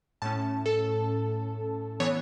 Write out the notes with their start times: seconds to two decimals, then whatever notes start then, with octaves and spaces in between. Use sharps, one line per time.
0.22 A2 A3 C#4 A5
0.66 A4
2.00 E3 B3 C#5